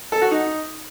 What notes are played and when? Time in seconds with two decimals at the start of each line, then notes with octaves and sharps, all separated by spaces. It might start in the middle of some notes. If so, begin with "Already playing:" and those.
0.12 A4
0.22 F#4
0.31 D#4